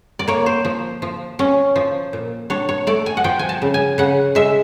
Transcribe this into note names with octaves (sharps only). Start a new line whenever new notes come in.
D5
A#3 C#5
C5
F3
F3
C#4
F3
A#2
D4 C#5
C#5
A3 D5
G#5
F#5
F3 G5
G#5
A5
C#3
G#5
C#3 F#5
G#3 E5